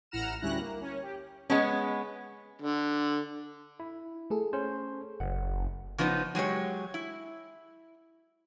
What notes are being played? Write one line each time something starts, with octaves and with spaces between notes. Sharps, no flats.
A1 E4 F#5 A#5 F6 E7
D2 G3 C#4 E4 F#6 A#6
A#3
C#4
G4
G#3 B3 C#4
D3
E4
A3 G#4 A4
C#4 C5
F#1 F#5
C#3 F3 B3 D#4
F#3 G#3 G4 C#5
E4